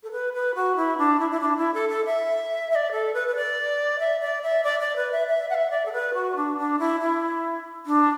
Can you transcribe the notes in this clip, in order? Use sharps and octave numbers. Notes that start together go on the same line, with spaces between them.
A4
B4
B4
F#4
E4
D4
E4
E4
D4
E4
A4
A4
E5
E5
D5
A4
B4
B4
D5
E5
D5
E5
D5
D5
B4
E5
E5
F#5
E5
D5
A4
B4
F#4
D4
D4
E4
E4
D4